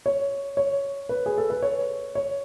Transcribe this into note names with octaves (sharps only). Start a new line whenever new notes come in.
C#5
C#5
B4
G#4
A4
B4
C#5
C#5